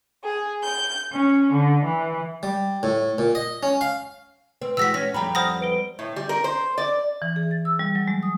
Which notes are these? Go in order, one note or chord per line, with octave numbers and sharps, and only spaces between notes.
G#4
G6
C#4
D3
E3
G3
A2
A#2
D#5
C#4
F5
C4 B4
E3 G#3 F#4 E6 A#6 B6
C#4 A#6
F2 G3 G4 A#5 B5
C5 F#5 B5 D#6 F6 A#6
B4 D7 G7
A2
G3
A#4
C5
D5
E3
G#4
A6
E6
G3
F#3
G#3
D#6